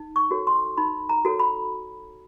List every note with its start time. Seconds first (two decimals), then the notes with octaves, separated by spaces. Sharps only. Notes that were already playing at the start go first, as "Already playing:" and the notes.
Already playing: D#4
0.16 C#6
0.31 F#4 A4 C#5
0.47 C6
0.77 D#4 B5
1.09 A#5
1.25 F#4 A4 C#5
1.40 B5